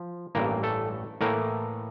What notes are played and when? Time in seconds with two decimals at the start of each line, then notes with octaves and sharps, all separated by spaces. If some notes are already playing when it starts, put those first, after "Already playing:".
Already playing: F3
0.35 A1 G2 E3 A#3 A#4
0.63 A3 A4
1.21 A2 E3 A3 A#3 A#4